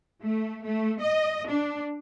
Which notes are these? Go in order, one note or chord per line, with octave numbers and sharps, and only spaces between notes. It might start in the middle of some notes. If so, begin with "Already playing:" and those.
A3
A3
D#5
D4